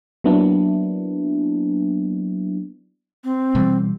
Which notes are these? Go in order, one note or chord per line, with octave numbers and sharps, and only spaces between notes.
F#3 A#3 B3 D4 E4
C4
B2 E3 G3